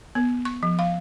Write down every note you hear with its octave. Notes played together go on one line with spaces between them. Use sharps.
B3
C#6
F3
F5